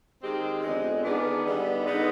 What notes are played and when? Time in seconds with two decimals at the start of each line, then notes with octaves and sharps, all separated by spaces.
0.22 D#3 G#3 C4 G4
0.63 F2 D3 G#3 B3
1.03 D#3 B3 D4 G#4
1.44 D3 G3 B3 D#4
1.86 D3 G#3 B3 D#4